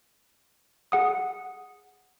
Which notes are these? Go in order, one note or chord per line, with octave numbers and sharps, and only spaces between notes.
G#4 F#5 D#6